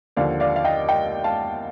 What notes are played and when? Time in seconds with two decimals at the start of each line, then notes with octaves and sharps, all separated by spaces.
0.17 D#2 D3 F3 D5 F5
0.40 D5 F5
0.56 F5
0.65 D#5 G5
0.88 D#5 G5
1.24 F5 A5